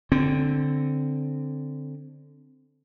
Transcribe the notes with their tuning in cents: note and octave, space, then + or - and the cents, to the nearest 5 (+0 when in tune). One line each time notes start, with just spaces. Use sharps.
D3 +0 C4 +0